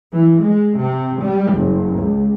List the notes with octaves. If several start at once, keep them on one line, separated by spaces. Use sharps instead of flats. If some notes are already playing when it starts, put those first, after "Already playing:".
E3
G#3
C3
G3
F#1
C#2